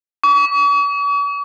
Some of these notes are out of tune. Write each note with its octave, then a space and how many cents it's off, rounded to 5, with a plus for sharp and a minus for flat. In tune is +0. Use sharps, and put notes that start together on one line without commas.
C#6 +45